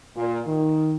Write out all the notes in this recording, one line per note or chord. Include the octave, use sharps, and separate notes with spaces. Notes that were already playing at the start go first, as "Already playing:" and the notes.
A#2
D#3